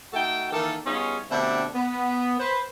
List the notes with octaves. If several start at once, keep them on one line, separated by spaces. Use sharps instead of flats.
A3 D#4 F#4 A4 G5
D#3 E3 A#3 A4
G3 B3 C#4 D#4 F4 G#4
B2 D3 A3 C4 D4 G4
B3
B4 C5